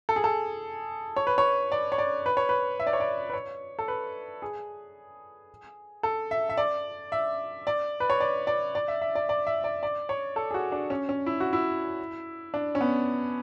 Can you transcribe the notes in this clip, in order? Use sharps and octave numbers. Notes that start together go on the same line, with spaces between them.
A4
G#4
A4
C#5
B4
C#5
D5
C#5
D5
B4
C#5
B4
E5
D5
C#5
D5
B4
C#5
A4
B4
G#4
A4
E5
E5
D5
E5
D5
B4
C#5
D5
D5
D5
E5
E5
D5
D5
E5
D5
D5
C#5
A4
G#4
F#4
D4
C#4
C#4
E4
F#4
E4
D4
C#4
B3